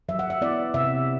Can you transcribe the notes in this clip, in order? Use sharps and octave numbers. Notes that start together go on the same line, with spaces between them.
F#3 E5
F#5
E5
B3 E4 D5
C3 E5